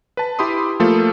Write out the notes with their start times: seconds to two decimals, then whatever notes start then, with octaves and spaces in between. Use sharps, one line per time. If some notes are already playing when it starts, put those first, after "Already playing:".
0.17 B4 A5
0.39 E4 G4 B5 C6 D#6
0.80 F3 A3 A#3 F4 A4